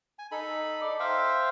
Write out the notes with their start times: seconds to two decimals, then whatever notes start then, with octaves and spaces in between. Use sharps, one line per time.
0.19 G#5
0.32 D#4 A4 B5
0.81 D5
1.00 C5 E5 F5 G5